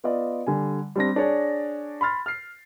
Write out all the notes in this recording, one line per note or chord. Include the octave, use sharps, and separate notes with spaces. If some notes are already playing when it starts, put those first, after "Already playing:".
B3 F4 D5 D#5
D3 G3 G#5
G3 C4 D4 A#6
D4 G#4 C#5 D5
B5 C6 F6 A6
F6 C7